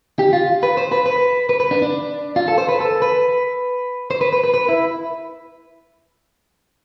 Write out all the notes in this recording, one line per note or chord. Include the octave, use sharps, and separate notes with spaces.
G4
F4
B4
C5
B4
B4
B4
B4
D4
D4
F4
A4
C5
B4
A4
B4
C5
B4
B4
B4
B4
E4